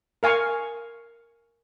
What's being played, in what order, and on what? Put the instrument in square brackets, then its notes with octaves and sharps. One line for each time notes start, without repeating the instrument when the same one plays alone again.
[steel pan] A#4 F5 G#5 C#6